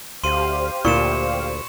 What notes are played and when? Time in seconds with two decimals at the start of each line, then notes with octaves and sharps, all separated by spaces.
0.24 D2 G4 C5 F5 C6 D#7
0.85 D2 A#2 C#6 C#7 E7